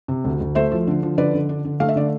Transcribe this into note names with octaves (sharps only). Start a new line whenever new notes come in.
C3
D2
D2
A3 C5 E5
F3
D3
F3
D3 B4 D5
D3
D4
D3
A3 F5
E5
D3 D5